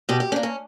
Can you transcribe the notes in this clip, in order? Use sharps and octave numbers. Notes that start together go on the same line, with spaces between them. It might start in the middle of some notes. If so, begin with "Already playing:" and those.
B2 G4
G4
A#3 C#4 D4
C#4